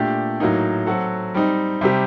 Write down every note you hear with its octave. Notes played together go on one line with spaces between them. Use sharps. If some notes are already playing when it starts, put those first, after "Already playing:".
Already playing: A#2 A3 D4 G4
A2 F#3 A#3 D#4
F#3 C4 F#4 A4
G3 C4 D#4
C3 G3 C4 G4